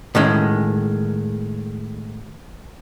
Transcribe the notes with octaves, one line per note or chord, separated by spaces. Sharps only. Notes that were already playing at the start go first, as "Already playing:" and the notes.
A2 D#3 G#3 C#4